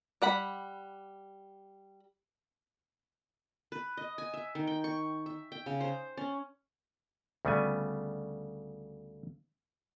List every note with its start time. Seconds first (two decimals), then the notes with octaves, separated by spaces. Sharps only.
0.22 G3 F#5 B5
3.72 B4
3.97 D#5
4.18 G#5
4.34 E5
4.55 D#3
4.67 G5
4.84 C#6
5.26 E5
5.52 G5
5.66 C#3
5.81 C5
6.17 C#4
7.45 D2 C#3 G3 B3 G#5